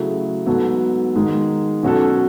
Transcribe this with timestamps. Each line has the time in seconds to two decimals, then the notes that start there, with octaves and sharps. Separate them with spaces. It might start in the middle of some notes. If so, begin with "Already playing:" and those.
Already playing: C#3 F#3 A3 E4 G#4
0.46 G#2 F#3 B3 F#4 A4
1.15 G#2 D#3 G#3
1.83 B2 F#3 C#4 F#4 A4